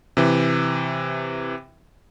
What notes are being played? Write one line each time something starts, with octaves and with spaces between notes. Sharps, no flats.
C3 E3